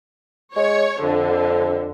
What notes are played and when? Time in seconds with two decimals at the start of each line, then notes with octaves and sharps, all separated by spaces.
0.56 G#3 C#5
1.03 F2 D3